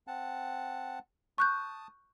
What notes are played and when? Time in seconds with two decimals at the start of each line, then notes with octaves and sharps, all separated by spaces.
0.07 C4 F#5 A5
1.38 A5 C#6 D#6 F#6 G6